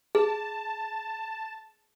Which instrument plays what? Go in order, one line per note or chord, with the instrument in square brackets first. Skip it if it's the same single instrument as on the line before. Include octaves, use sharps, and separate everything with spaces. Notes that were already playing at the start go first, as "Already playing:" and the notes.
[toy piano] G#4 [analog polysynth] A5